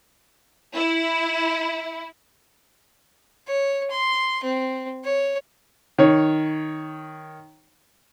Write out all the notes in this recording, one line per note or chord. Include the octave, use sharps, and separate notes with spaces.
E4
C#5
C6
C4
C#5
D#3 C#5